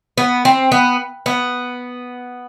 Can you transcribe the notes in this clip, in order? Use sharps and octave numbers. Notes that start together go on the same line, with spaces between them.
B3
C4
B3
B3